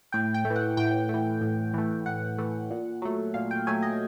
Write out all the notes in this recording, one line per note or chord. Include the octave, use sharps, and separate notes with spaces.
A2 G5
G5
A3
E3
F#5
A2 G5
E3 A3
A2
E3 A3
A2 F#5
E3 A3
A#2
F#3 A3
A#2 F5
G5
F#3 A3 G#5
D#5